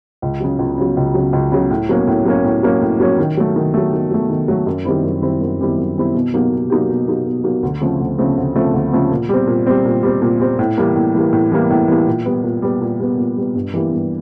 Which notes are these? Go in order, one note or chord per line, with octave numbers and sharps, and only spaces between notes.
C#2
C#3 F#3
C#2
C#3 F#3
C#2
C#3 F#3
C#2
C#3 F#3
A2
F#3 A#3 C#4
A2
F#3 A#3 C#4
A2
F#3 A#3 C#4
A2
F#3 A#3 C#4
D#3
F#3 A3
D#3
F#3 A3
D#3
F#3 A3
D#3
F#3 A3
F#2
D#3 G3 C4 E4
F#2
D#3 G3 C4 E4
F#2
D#3 G3 C4 E4
F#2
D#3 G3 C4 E4
B2
F#3 A#3 D#4 G4
B2
F#3 A#3 D#4 G4
B2
F#3 A#3 D#4 G4
B2
F#3 A#3 D#4 G4
D2
C#3 F3 A3 C4
D2
C#3 F3 A3 C4
D2
C#3 F3 A3 C4
D2
C#3 F3 A3 C4
A#2
G3 C4
A#2
G3 C4
A#2
G3 C4
A#2
G3 C4
A2
E3 G3 A#3
A2
E3 G3 A#3
A2
E3 G3 A#3
A2
E3 G3 A#3
A#2
G3 B3
A#2
G3 B3
A#2
G3 B3
A#2
G3 B3
G2
E3 G3 A#3
G2